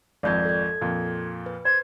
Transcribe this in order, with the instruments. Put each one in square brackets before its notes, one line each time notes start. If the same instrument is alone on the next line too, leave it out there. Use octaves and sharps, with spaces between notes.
[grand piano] G#1 F2 [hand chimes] D5 G6 G#6
[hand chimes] A4 G#6
[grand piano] F2 A#2
[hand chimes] B4
[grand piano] C5 [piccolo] G#6